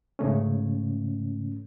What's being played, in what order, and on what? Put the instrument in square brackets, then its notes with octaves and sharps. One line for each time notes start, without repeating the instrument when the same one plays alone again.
[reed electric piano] G#2 C#3 A3 C#4